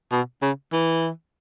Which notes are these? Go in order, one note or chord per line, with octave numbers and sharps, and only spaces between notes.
B2
C#3
E3